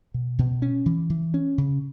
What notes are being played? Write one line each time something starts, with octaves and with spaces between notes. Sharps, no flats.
B2
B2
C#4
E3
E3
C#4
C#3